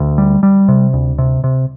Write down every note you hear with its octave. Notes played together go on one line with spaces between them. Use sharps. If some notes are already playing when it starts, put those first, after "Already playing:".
Already playing: D2
G3
G3
C3
D2
C3
C3